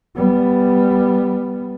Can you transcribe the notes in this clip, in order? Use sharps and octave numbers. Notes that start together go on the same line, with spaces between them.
G3 B3